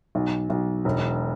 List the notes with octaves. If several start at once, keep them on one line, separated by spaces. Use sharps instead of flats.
B1
B1
E1